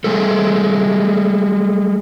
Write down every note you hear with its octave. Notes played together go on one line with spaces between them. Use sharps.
G3 G#3 A4